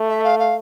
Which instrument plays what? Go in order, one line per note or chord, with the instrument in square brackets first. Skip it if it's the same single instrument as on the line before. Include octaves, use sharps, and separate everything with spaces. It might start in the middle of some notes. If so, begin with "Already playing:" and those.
Already playing: [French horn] A3
[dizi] E5
F5
F5